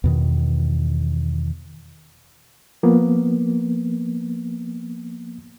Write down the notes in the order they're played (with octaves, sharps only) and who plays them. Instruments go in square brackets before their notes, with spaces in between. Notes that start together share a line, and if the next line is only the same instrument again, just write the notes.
[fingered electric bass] E2 B2 D#3
[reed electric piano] F3 A#3 B3